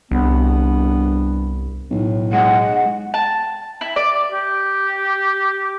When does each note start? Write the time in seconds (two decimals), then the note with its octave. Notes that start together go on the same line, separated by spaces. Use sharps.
0.11 C2 G2 B3
1.91 B1 A2
2.33 G#3 F#5
3.14 A5
3.81 E4
3.96 D5
4.32 G4